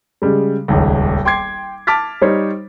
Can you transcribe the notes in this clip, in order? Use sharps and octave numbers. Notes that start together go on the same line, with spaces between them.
C#3 G3 G#3
D#1 G#1 C#2
G5 C6 D6 G#6 C7
A5 D6 F6 A6 B6
G3 D#4 C5 C#5